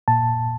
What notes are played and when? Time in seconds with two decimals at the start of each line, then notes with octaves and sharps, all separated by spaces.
0.08 A#2 A5